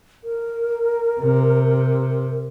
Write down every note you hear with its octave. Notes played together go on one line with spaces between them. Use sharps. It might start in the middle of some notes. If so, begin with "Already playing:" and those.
A#4
C3